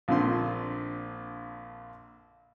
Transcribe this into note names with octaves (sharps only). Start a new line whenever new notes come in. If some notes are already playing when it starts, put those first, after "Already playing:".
A#1 A#2 D3 C4 C6